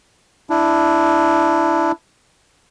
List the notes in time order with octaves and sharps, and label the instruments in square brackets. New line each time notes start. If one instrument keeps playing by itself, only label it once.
[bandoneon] D4 E4